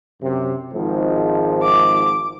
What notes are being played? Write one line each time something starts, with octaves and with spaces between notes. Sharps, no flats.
F#2 C3
G#1 G#2 F3
D6